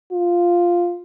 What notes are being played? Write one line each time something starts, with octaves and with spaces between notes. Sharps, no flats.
F4